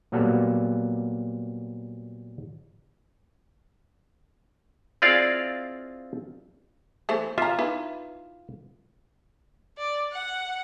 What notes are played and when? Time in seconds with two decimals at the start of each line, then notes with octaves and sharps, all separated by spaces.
0.12 A#2 F#3 G3 A#3 B3 A4
5.02 C4 E4 F4 G#4 D5 F5
7.09 E3 A3 C5
7.38 F4 E5 A#5
7.59 D#4 E4 B4
9.78 D5
10.12 F#5